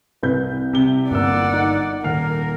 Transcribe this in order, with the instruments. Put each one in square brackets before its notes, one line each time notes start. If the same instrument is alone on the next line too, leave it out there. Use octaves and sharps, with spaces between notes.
[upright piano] C2 B4 G6
[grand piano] C3 G7
[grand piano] G1 A#3 E6 [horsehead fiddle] D5 F#5
[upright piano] D#4
[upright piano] D#1 F#5 C7 [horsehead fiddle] A#3 A#4 [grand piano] F6